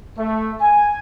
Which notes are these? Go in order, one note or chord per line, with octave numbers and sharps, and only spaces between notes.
A3
G#5